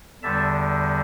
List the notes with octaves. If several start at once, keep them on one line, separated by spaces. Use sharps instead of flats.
E2 D3 G3 E5 A5